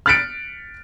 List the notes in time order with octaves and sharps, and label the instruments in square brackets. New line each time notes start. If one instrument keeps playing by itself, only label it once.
[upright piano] F6 F#6 A6 B6 C#7 D7